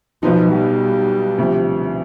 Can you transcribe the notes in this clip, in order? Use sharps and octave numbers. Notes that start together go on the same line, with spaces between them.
B1 B2 F3 B3 D#4
G3
D2 C3 F3